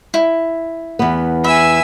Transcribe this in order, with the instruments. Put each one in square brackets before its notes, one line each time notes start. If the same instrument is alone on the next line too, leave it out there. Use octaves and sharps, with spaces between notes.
[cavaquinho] E4
[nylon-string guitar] E2 B3
[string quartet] E5 G#5 E6 [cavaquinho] B5